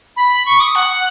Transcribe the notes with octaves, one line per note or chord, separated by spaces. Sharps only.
B5
C#6
D#6
F#5